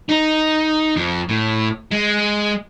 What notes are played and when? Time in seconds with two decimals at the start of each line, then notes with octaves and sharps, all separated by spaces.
0.09 D#4
0.96 F2
1.29 A2
1.91 G#3